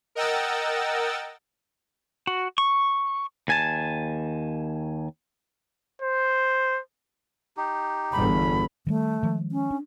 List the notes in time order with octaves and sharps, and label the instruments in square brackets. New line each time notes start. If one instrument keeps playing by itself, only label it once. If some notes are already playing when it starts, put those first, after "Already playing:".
[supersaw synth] A#4 D#5 F#5 G5 E6 A6
[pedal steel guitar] F#4
C#6
[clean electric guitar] D#2 G#5 A5
[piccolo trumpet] C5
[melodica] D#4 G4
[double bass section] G1 E2 [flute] B5
[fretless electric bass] D#3 G3 [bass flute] A3
[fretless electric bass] D#3 F3 G#3
[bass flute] C#4
[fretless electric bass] D4